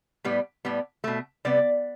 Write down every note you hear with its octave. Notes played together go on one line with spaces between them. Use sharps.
A2 G3 B3
A2 G3 B3
B2 A3
C3 G3 B3 D5